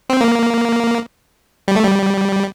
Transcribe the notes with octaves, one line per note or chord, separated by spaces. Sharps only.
C4
A#3
G3
A3
G3